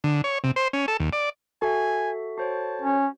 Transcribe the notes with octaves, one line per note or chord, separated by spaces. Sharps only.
D3
C#5
C3
C5
C#4
A4
D#2
D5
F#4 A4 E5 G#5
F#4 C5 C#5 A5
C#4